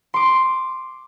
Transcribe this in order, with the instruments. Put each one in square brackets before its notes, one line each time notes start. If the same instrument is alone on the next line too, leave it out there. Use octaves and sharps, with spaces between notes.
[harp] C6 D6